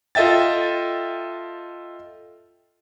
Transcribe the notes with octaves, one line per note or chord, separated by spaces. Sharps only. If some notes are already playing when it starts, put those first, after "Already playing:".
F4 A4 D#5 E5 G5 A6